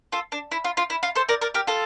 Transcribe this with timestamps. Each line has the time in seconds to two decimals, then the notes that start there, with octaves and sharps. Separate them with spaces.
0.12 F4 A4
0.32 D4
0.52 E4
0.64 F4
0.77 F4
0.90 E4
1.03 F4
1.16 A4 C5
1.29 A#4 D5
1.41 A#4 D5
1.54 G4 A#4
1.67 F4 A4